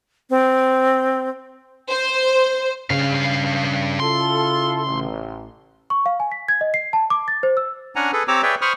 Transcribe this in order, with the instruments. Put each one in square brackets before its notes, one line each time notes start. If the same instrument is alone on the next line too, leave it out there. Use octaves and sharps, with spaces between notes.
[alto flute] C4
[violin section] C5
[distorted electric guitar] G2 F5 [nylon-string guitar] C#3
[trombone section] E4 F4 A4 [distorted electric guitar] C6
[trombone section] A1
[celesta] C#6
F5
G#5
B6
G#6
D#5
C7
A5
D6
A6
C5
E6
[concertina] C#4 D4 F#5 G#5 A#5
G#4 A4 B4
C4 G4 C#5 A#5 D6 E6
G#4 B4 C#5 D5 E5 G5
C5 B5 C#6 D#6 F6